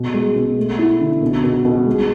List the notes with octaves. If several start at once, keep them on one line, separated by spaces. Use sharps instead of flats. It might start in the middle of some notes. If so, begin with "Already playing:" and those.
Already playing: B2
G#3
B2
A3
E4
D3
B2
B2
B2
G#3